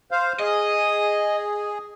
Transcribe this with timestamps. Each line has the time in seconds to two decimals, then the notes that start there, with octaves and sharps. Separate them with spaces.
0.11 C5 F5
0.39 G#4 D#5